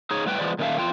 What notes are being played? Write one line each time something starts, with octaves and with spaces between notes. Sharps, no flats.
D#4 G#4 C#5
A2 G3 B3 B4 G5
E3 F3 G#3 B3 D5
A#2 D#3 C#4 A4 E5 F5
E2 F4 G5